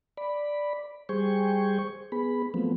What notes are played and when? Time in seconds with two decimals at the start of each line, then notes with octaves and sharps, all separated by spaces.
0.17 D5 B5
1.09 G3 G#4 C5 G5 G#5 C#6
2.12 B3 G#4 B5
2.54 F3 F#3 A3 B3 C4